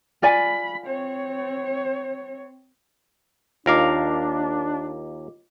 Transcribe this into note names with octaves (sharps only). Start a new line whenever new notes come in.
F4 D5 G#5 B5
C4 C#5
D#2 D4 F4 A#4 D#5 F5 D6